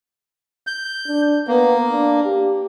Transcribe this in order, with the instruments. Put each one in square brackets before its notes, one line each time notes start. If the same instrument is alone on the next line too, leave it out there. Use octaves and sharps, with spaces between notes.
[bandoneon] G6
[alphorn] D4
[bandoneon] A#3 [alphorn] B3
[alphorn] D4
G4